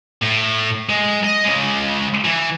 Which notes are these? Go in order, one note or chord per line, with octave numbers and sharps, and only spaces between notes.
A2
G#3
D#5
C#3 G#3
E3